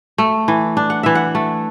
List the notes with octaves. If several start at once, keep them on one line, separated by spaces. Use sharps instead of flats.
A3
E3
D4
F#5
E3 E5
F#5
A3